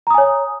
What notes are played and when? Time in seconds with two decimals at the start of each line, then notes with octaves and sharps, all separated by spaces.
0.07 A#5
0.11 D#6
0.14 G#5
0.18 C#5